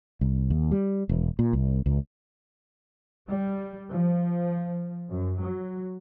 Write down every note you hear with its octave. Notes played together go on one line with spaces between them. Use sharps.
C2
D#2
G3
E1
A#2
C2
C#2
G3
F3
F#2
F#3